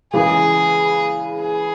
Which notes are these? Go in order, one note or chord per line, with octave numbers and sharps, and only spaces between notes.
C#3 E3 G#3 G#4
G#4